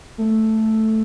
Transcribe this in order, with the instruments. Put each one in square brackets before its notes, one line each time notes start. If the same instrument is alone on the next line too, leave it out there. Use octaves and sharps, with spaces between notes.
[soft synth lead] A3